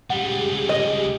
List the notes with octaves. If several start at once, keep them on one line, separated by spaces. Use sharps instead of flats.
C#2 G3 G4 G#4 F#5
D#5